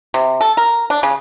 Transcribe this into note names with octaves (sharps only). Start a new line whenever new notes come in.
C3
A4
A#4
D4
C#3